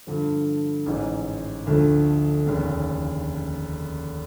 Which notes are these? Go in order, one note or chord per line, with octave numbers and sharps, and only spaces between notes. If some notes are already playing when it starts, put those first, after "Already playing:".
G2 D3 F3
A1 G#2 E3
D2 D3 F3 A3
F1 D#2 C#3